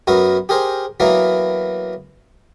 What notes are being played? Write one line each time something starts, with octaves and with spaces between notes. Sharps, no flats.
F#2 B3 F#4 A#4
G4 G#4 A#4 C5
E3 F#3 A#3 B3 A#4